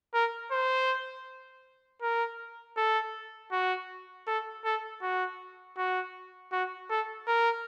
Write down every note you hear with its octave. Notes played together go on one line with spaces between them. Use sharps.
A#4
C5
A#4
A4
F#4
A4
A4
F#4
F#4
F#4
A4
A#4